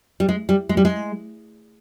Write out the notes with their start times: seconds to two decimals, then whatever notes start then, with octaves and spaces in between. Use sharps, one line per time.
0.20 G3
0.29 G#3
0.49 G3
0.69 G#3
0.77 G3
0.85 G#3